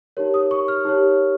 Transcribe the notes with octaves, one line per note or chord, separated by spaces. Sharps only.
D#4 G4 A#4 C#5
D#6
C#6
F6
D#4 G4 A#4 C#5